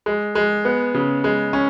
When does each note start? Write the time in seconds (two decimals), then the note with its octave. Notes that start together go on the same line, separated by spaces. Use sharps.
0.06 G#3
0.35 G#3
0.65 B3
0.94 C#3
1.24 G#3
1.53 C#4